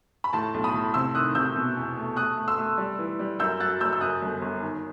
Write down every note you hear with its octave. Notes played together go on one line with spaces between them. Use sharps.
B5
A2 A5 C6
B1
B5 D#6
A2
C3 C6 E6
D#3 D#6 F#6
C3 E6 G6
B2
E2
A3
A3 D#6 F#6
A3
C6 E6
A3
G3
E3
G3
F#2 E6 G6
F#3 F#6 A6
F#1 E6 G6
E6
F#2 D#6 F#6
G1
G1
D#3